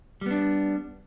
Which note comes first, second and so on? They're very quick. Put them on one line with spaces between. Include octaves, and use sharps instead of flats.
G3 B3 D4